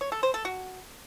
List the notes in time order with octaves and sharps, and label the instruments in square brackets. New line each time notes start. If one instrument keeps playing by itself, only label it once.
[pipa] C#5
A4
C5
A4
F#4